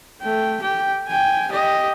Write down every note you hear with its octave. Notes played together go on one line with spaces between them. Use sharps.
A3 G5
G4 G5
G5 G#5
G4 D#5